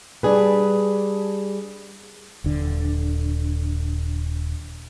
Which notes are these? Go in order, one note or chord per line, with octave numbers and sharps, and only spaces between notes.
G3 D4 G#4 B4
D#1 D3